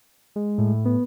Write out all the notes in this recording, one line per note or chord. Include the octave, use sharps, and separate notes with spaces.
G#3
A2
B3